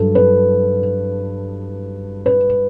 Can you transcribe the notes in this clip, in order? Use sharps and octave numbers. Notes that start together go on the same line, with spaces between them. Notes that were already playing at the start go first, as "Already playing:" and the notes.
Already playing: G2 F#3 A4
B4
B4